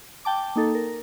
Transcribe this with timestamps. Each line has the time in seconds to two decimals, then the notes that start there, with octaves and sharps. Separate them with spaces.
0.25 G5 A5 D6
0.56 A#3 D#4 A4
0.75 A#4